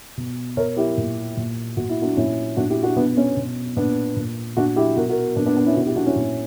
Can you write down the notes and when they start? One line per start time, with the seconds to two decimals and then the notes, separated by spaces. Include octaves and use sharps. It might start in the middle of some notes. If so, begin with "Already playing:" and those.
0.17 B2
0.57 B2 A#4 C#5
0.77 E4 G4
0.97 A#2
1.37 A#2
1.77 A#2 F#4
1.89 E4
2.02 D4 F#4
2.17 A#2 C#4 E4
2.57 A#2 D4 F#4
2.70 E4 G4
2.83 D4 F#4
2.96 B2 B3 D4
3.17 C#4
3.37 B2
3.76 A#2 B3 D4
4.16 A#2
4.57 A#2 D4 F#4
4.76 E4 G4
4.96 B2 F#4 A#4
5.09 F#4 A#4
5.36 A#2 B3 D4
5.46 B3 D4
5.56 B3 D4
5.66 C#4 E4
5.76 B2 D4 F#4
5.86 E4 G4
5.96 D4 F#4
6.06 C#4 E4
6.16 A#2